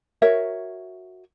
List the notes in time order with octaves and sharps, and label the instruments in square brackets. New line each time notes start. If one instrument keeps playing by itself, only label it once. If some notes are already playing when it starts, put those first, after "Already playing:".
[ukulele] F#4 A#4 C#5 E5